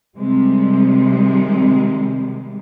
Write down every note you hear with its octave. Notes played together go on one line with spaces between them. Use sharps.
C3 D#3 G3 G#3